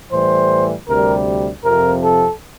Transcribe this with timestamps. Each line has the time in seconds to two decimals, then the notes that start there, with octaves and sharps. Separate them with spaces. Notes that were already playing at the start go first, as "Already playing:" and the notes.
0.10 A2 E3 G3 C5
0.88 D2 C3 G3 A#4
1.64 F2 C3 F3 A#4
2.03 A4